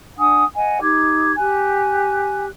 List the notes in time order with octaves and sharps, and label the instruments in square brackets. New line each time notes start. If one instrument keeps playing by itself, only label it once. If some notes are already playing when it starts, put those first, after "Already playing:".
[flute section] D4 F#5 G#5 D#6
D#5 F#5 G#5
D#4 G4 D6 G#6
G4 G#5 F#6